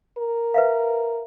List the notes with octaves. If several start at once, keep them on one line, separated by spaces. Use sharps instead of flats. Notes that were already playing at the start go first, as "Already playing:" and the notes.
A#4
B4 E5 F5